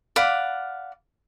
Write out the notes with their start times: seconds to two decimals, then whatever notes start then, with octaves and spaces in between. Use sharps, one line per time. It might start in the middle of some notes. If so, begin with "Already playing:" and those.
0.16 D5 F5 F#5 B5